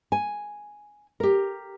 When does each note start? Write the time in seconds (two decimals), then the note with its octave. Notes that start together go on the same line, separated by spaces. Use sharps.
0.12 G#5
1.20 G4 A#4